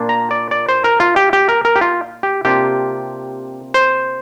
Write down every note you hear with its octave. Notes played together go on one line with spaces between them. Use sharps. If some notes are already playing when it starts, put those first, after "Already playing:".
Already playing: A#2 A#3 D4 F4
A#5
D5
D5
C5
A#4
F4
G4
G4
A#4
A#4
G4
F4
G4
C3 A#3 D4 F4 G4
C5